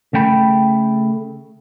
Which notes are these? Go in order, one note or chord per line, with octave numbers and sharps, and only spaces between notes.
C#3 A3 G5 B5